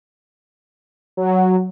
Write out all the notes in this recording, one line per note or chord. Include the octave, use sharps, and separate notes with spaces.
F#3